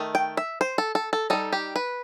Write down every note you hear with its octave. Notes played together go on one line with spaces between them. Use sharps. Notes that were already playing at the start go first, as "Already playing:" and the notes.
Already playing: D#3 A3
G5
E5
C5
A4
A4
A4
G3 D#4 A4
G4
B4